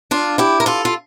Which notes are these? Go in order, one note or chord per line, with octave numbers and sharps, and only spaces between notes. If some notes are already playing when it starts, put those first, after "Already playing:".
D4 F4
E4 G4
A#4
F4 A4
F4